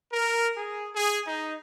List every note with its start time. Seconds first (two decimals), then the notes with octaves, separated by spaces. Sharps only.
0.12 A#4
0.57 G#4
0.95 G#4
1.26 D#4